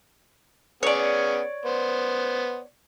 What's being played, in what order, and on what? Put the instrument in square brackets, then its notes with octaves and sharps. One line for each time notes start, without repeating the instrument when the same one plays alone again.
[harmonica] B3 C#4 G#4 [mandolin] C#5 D5
[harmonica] B3 C5